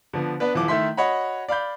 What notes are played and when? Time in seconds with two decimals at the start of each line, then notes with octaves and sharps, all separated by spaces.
0.13 D3 F3 B3
0.40 B3 D4 B4
0.54 D#1 E3 F3 D6
0.68 D#3 A3 E4 C6 B6
0.97 F#4 C#5 D#5 F#5 B5
1.49 D5 F5 B5 G6